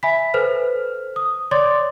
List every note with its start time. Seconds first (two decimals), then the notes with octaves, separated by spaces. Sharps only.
0.03 E5 G#5 B5 B6
0.34 A4 B4 C5 F6
1.16 D#6
1.51 C#5 D5 C6 D6 A6